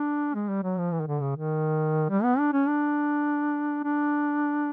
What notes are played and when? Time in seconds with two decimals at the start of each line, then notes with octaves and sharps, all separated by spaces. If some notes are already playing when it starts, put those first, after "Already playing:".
Already playing: D4
0.34 G#3
0.49 G3
0.63 F#3
0.78 F3
0.92 E3
1.00 D#3
1.07 D3
1.21 C#3
1.36 D#3
2.09 G3
2.24 B3
2.39 D4
2.53 C#4
2.68 D4
3.84 D4